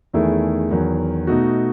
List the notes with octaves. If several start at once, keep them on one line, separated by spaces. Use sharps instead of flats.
E2 D#3 A3 E4 G#4
E2 D#3 F#3
B2 A3 D#4 F#4